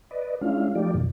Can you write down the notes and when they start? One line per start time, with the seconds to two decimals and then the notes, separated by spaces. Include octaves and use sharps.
0.11 B4 D5 D#5
0.41 G#3 C#4 D4 E4 F4 F5
0.75 F3 A3 D#4 F4 G4 D5
0.94 F#2 B2 D#3